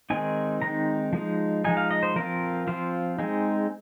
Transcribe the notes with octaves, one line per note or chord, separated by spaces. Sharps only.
D#3 G#3 C4 D#4 G#5
D#3 G#3 C4 D#4 A#5
F3 G#3 D#4
F3 G#3 D#4 G#5
F5
D#5
C5
F3 C4 F4 A#4
F3 C4 F4 C5
G#3 C4 D#4 G#4